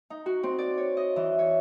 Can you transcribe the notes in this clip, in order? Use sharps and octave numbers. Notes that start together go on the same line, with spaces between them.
D#4
F#4
C4
D5
C#5
D#5
E3
C#5